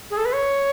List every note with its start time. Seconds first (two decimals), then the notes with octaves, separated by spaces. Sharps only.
0.11 G#4
0.17 A4
0.25 B4
0.33 C#5